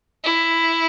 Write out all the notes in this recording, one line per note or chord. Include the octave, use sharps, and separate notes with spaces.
E4